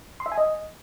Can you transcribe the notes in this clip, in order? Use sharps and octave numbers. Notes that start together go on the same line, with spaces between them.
C6
E5
G#5
D#5